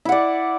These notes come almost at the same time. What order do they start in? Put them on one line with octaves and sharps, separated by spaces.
E4 F#5 D5